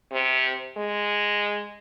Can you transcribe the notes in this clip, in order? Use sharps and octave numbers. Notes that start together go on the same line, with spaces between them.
C3
G#3